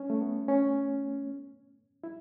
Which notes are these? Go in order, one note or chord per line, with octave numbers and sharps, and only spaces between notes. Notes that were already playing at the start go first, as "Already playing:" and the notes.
Already playing: C#4
A3
B3
C#4
E4